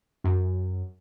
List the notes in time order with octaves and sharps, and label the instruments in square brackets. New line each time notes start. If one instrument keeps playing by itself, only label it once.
[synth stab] F#2